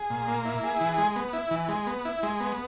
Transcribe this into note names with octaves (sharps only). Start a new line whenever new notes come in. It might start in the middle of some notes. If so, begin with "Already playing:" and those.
Already playing: G#4
A#2
A#3
E4
G#4
E3
G#3
B3
E4
E3
G#3
B3
E4
G#3
B3